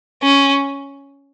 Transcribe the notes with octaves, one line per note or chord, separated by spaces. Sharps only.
C#4